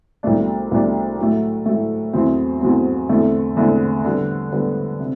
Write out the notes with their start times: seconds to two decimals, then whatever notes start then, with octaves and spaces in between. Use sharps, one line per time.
0.23 C2 B2 A3 D4
0.71 C2 B2 A3 D4
1.19 A2 F#3 A3
1.66 A2 F#3 A3
2.13 E2 B2 F#3 A3 C4
2.61 E2 B2 F#3 A3 C4
3.09 E2 D3 A3 C4
3.56 E2 D3 A3 C4
4.05 D3 G3 B3
4.52 D3 G3 B3
5.00 C3